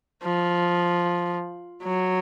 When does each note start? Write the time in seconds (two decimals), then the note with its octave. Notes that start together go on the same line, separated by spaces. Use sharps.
0.24 F3
1.83 F#3